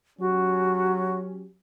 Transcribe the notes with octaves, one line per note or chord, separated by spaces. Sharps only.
F#3 C#4 F#4 G4